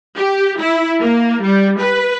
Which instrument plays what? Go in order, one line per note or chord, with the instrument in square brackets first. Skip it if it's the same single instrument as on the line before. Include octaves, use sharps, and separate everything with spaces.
[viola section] G4
E4
A#3
G3
B4